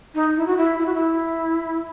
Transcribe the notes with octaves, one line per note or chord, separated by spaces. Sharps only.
D#4
E4
F#4
E4
E4
F#4
E4